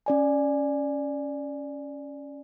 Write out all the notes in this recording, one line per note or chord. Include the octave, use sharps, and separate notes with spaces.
C#4 D5 G#5